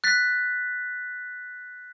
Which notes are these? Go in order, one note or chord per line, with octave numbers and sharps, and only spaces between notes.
F#6 A6 B6